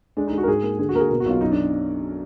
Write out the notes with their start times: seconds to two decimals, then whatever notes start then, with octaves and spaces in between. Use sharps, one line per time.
0.17 G#3 D4
0.27 D#4
0.33 G#3 F#4
0.43 A#4
0.48 G#2 G#4
0.63 A#3
0.79 D3 G#4
0.89 F#4
0.95 A#3 A#4
1.00 G#4
1.10 B2 A#4
1.20 F#4
1.26 B1 F4
1.41 F#2 D#4
1.52 D4